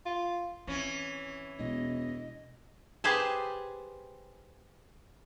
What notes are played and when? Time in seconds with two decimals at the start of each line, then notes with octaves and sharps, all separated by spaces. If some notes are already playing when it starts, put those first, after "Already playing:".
0.06 F4
0.67 E3 C4 C#4
1.59 E1 B2 D#5
3.04 G4 G#4 B4 C5 G#5 A5